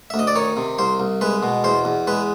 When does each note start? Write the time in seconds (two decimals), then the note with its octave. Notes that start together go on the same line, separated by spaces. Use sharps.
0.10 E5
0.14 D2
0.19 D#5
0.27 D5
0.36 D#3 C#5
0.57 C3
0.79 C2 C5
1.00 C2
1.21 G#3 B4
1.43 B2
1.64 E2 C5
1.85 E2
2.07 G#3 B4